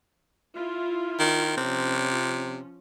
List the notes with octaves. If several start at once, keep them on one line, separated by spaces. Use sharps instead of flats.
E4 F4
D#3
C3 F3 C#4